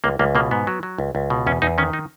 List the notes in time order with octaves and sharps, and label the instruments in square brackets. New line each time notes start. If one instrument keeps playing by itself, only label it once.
[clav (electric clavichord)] C#2 A#3
C#2 A#3
B2 A#3
G#2 B3
F#3
F#3
C#2
C#2
B2
E2 C#4
E2 D#4
D#3 C#4
D#4